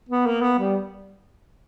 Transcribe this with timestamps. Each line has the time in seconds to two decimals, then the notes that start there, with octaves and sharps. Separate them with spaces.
0.09 B3
0.26 A#3
0.42 B3
0.59 G3